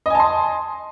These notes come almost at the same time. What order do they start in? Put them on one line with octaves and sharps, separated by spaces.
D#5 G#5 A5 C6